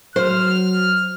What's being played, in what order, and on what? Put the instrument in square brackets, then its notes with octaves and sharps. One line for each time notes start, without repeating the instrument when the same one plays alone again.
[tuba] F#3 [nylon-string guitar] C5 [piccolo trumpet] F6